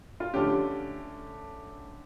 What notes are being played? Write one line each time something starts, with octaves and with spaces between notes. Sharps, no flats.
F4
D3 A3 C#4 G4